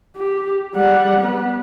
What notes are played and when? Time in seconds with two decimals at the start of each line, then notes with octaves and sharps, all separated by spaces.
0.16 G4
0.75 G3 F#5
1.20 B3 B4